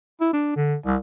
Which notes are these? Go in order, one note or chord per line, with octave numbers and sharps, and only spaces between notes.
E4
D4
D3
C2